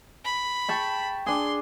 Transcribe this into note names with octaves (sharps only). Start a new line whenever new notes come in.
B5
G5 A5 C#6
D4 G#4 C6